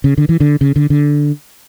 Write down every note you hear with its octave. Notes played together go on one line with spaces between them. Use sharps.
C#3
D3
E3
D3
C#3
D3
D3